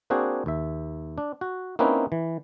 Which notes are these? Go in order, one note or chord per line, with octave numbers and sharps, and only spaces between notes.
A#3 C4 D4 F#4 G#4 C5
D#2 E5
D4
F#4
A#3 C4 C#4 D#4 E4 B4
E3